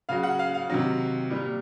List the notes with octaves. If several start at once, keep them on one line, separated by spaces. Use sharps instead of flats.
C#3 F#3 F5
F#5
F5
F5
C3 D#3 F#3
A#2 G3